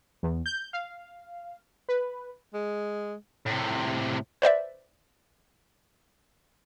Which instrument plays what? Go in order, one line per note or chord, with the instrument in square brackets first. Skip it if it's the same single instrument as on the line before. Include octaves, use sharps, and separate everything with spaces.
[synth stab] E2
G6
F5
B4
[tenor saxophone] G#3
[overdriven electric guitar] A2 C3
[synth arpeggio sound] B4 C5 D5 E5